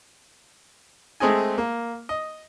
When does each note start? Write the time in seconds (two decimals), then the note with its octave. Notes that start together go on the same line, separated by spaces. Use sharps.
1.20 G#3 A3 C4 G#4 D#5 G#5
1.58 A#3
2.09 D#5